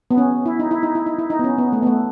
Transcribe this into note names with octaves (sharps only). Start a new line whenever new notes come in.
B3
C#4
E4
D#4
E4
D#4
E4
D#4
E4
D#4
B3
C#4
B3
A3
B3
A3